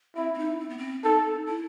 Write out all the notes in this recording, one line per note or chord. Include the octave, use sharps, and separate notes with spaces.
C4 E4
C4
D#4
C4
B3
C4
D#4 A4
E4